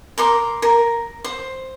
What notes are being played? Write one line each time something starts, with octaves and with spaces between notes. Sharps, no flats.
A#4 C6 D6
A#4
C5